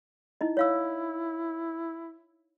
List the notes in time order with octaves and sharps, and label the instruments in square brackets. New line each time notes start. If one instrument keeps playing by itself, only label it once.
[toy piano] D#4 E4 D#5
[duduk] E4 [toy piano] C#5 F5 E6